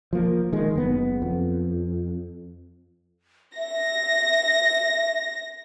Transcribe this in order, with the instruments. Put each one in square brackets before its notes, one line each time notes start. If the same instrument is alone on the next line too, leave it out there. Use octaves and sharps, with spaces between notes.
[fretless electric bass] F3 A#3
D#3 G#3
F#1 B3
F2
[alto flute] E5 [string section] A#6